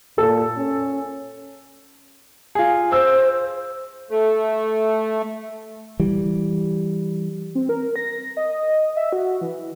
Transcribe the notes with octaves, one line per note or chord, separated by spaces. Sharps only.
A#2 A4
C#4
F4 G#4
C5 E6
A3
E3 G3
C4
A#4
A#6
D#5
E5
F#4
E3